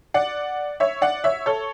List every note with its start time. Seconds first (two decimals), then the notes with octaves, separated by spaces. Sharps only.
0.14 D5 F#5
0.80 C#5 E5
1.02 D5 F#5
1.24 C#5 E5
1.46 A4 C#5